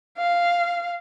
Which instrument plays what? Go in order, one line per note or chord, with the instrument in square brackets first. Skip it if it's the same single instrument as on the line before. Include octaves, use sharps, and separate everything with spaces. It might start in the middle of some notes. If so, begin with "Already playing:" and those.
[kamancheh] F5